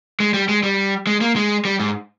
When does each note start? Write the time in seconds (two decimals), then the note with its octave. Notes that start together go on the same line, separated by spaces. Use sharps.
0.20 G#3
0.34 G3
0.49 G#3
0.63 G3
1.07 G#3
1.21 A#3
1.36 G#3
1.65 G3
1.80 G#2